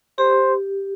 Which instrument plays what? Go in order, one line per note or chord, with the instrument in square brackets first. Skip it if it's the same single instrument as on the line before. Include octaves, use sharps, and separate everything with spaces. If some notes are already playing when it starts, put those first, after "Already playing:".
[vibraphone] G4 [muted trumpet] C5